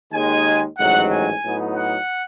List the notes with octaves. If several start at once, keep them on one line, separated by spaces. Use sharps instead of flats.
D#2 D#3 G#3 G#5
A1 G#2 D#3 F#3 F#5
G#5
A2 F#3 B3 D#4
F#5